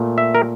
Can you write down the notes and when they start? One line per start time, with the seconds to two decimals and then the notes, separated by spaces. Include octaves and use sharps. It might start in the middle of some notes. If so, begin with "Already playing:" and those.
Already playing: A#2 A3
0.18 E5
0.35 A#4